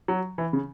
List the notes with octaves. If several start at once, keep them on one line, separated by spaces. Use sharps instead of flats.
F#3
E3
C#3